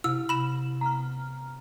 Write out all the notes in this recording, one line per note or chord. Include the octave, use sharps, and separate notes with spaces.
C3 E4 E6
B5 E7
B3 A#5 F6